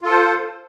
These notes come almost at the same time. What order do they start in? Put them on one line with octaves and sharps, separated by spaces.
F4 A4 C5